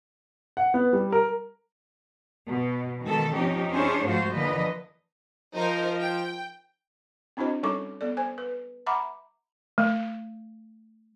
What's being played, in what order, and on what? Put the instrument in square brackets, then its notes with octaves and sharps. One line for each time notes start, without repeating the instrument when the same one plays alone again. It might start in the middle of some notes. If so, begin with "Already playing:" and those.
[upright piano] F#5
B3
G3
A#4
[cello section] B2
B2 D#3 E3 G#3 A4
F3 C4 C#4 D#4 G4
C#4 D4 E4 G#4 C5 C#5
G#2 F3 A3 F4 F#4 C5
D3 E3 F3 A#3 B4 D#5
[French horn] F3 [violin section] D#4 A#4 C5
[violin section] G5
[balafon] C4 D4 E4 F#4 C5 D#5
G3 C#4 D#4 A4 C#6 D6
B3 A4 D5
C5 G#5
B4
E5 F#5 A#5 B5 D6
A3